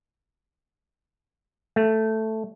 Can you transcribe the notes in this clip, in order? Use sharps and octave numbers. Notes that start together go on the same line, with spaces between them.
A3